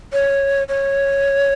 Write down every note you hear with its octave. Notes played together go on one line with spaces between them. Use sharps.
C#5
C#5